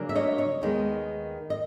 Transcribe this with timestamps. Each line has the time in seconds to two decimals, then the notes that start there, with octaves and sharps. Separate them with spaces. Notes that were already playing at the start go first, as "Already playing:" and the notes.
Already playing: C#3 F#3 A#3 D4
0.09 E5
0.15 C#5 D#5
0.38 C#5 D#5
0.62 D#2 D#3 G#3 B3
1.50 D#5